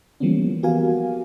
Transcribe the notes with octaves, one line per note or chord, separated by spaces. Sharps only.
E3 F3 G3 A#3 B3 C#4
B3 F#4 G4 A#4 F5 G#5